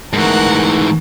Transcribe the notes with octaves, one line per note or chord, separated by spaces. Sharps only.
G#2 E3 A3 D#4 A#4 F#5 C#6